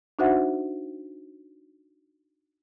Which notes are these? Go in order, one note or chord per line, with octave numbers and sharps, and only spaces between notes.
D4 D#4 F#4 C5 E5 F#5